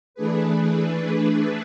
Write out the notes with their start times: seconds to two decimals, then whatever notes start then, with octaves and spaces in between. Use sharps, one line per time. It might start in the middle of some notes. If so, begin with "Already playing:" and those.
0.14 E3 A3 D4 G#4 B4